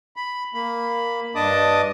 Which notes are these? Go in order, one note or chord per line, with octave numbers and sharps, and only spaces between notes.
B5
A#3 B5
G2 D4 D#5 A5 D6 D#6